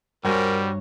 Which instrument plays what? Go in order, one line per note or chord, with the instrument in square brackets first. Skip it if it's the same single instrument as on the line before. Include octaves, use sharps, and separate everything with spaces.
[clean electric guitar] G2 C#5 [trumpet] G3 [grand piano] F#4 C5 G#5 [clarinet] A#4